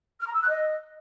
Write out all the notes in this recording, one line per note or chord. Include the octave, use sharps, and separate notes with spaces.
F6
A#5
E6
F#6
D#5